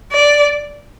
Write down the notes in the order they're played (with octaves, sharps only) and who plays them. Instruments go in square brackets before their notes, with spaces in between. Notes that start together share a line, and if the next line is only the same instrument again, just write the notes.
[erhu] D5